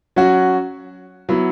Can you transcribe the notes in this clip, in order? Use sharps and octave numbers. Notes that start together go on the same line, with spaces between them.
F#3 C#4 F#4
F#3 B3 E4